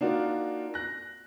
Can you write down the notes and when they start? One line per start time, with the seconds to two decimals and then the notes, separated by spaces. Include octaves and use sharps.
0.01 A#3 D4 D#4 F4 F#4
0.74 F#6 A#6